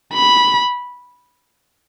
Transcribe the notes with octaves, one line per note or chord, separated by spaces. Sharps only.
B5